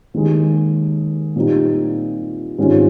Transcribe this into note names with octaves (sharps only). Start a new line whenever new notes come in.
D#2 D#3 G#3
A#2 G3 C4 D#4
G#1 G#2 G3 C#4 F4